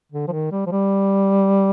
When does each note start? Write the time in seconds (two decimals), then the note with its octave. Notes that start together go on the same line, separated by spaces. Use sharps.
0.12 D3
0.28 F3
0.32 D#3
0.52 G3
0.66 F3
0.72 G3